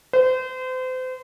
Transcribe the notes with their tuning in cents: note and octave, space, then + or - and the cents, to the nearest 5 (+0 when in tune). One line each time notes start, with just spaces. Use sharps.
C5 -35